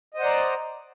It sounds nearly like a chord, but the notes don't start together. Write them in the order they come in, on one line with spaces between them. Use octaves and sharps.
D#5 C5 F#5 D5 A#5